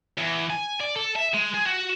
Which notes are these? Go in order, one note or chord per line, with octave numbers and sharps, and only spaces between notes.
E2
G#5
D5
A4
E5
G#3
G#4
F#4